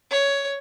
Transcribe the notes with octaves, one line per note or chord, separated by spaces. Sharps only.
C#5